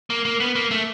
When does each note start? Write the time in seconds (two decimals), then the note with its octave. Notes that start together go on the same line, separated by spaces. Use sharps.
0.10 A#3
0.25 A#3
0.40 B3
0.55 A#3
0.71 A3